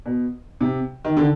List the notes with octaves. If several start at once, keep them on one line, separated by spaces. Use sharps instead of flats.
B2
C3
D#3
D3